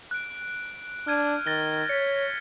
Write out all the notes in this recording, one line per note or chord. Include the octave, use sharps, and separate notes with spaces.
F#6 D7
D4 F6 G#6 D#7
D#3 A6 A#6 G7
C#5 B6 C#7